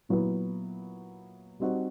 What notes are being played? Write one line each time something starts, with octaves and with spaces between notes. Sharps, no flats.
A#2 F#3 B3 E4
G3 C4 D#4 F#4